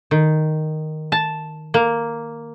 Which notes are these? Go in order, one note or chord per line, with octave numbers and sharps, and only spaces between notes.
D#3
A5
A#3